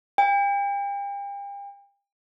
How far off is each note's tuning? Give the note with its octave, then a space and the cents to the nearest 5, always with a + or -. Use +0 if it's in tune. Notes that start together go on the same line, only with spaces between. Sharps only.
G5 +40